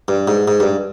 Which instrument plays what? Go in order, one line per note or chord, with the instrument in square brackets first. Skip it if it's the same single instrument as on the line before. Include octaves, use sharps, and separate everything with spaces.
[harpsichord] G2
G#2
G#2
G2